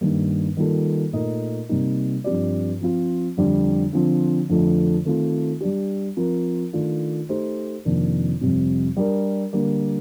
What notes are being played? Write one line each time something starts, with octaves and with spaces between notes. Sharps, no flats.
G2 D#3 G3 A#3
D#3 G3 A#3 F4 A4
A#2 A3 D#4 A#4 D#5
C3 G3 A#3 D#4
G2 F3 C4 G4 D5
F3 C4 F4
F2 D3 G3
D3 F3 C4
F2 D3 F3 A3
D#3 A3 C4 F4
G3 D4 G4
F3 C4 F4 A#4
D#3 A3 D4 F4
A3 D#4 G4 C5
F2 C3 D#3 A#3 D4
F2 C3 G3 C4
G3 D4 G4 A#4
D3 G3 A#3